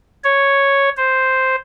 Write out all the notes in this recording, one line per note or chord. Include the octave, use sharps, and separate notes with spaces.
C#5
C5